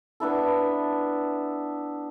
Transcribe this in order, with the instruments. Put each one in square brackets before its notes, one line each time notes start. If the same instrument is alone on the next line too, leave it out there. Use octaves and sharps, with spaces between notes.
[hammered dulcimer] B3 D4 E4 A4